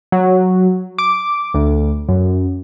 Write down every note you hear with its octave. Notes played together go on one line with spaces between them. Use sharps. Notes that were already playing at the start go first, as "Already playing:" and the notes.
F#3
D6
D2
F#2